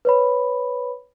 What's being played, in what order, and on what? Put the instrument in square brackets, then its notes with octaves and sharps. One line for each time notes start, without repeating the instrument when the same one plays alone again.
[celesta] B4 C#5 B5